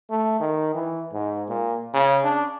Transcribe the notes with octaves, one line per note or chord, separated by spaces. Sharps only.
A3
D#3
E3
G#2
A#2
C#3
D4